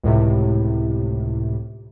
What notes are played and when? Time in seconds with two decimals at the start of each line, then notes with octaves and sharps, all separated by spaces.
0.03 C#2 A2 C3